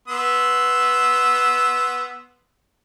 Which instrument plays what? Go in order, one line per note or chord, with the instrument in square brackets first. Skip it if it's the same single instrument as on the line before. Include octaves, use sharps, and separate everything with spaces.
[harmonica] B3 C6 E6